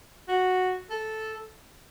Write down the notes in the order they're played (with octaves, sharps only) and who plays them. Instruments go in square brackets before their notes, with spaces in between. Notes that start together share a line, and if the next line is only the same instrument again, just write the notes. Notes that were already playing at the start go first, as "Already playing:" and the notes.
[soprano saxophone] F#4
A4